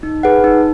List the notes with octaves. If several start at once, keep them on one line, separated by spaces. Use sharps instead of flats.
D#4
G#4 B4 F#5
D#4